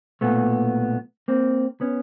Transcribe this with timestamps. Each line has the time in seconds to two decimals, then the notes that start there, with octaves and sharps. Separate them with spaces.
0.21 B1 A#2 A3 B3
1.28 A#3 C4
1.81 B3 C#4